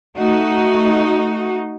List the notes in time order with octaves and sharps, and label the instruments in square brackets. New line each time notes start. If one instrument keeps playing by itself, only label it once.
[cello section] A3 D#4 F#4